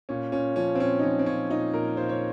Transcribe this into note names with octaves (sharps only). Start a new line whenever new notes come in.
A#2 C#4
A#2 C#4
F3 C#4
C4
A#2 C#4
D#4
F3 C#4
C4
A#2 C#4
A#2 D#4
A#2 A#4
A#2 C5
C#5